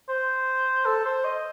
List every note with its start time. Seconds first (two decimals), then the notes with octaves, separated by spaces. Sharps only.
0.09 C5
0.86 A4
1.05 C5
1.25 D#5